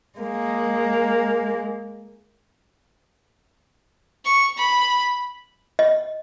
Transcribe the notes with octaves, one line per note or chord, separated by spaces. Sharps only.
G#3 A#3
C#6
B5
D#5